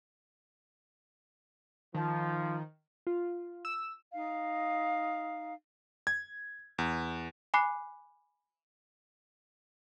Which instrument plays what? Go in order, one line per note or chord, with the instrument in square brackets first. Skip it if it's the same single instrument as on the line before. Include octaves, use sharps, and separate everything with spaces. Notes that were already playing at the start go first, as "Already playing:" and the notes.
[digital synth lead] D#3 [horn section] F3
[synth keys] F4
E6
[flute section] D#4 F5
[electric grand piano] G#6
E2
[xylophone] G#5 B5 D6 F#6 C7